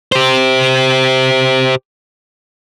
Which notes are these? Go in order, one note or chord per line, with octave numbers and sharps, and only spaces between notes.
G4 C5